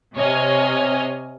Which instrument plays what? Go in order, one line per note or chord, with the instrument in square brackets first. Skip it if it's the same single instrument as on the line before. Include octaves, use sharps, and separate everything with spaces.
[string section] C3 C#5 D#5 G#5 F6